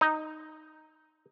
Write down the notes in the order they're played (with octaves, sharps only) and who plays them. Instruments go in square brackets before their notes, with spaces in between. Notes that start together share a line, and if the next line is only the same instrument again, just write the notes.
[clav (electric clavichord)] D#4